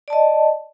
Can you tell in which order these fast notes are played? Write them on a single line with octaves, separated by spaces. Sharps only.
D5 A5 D#5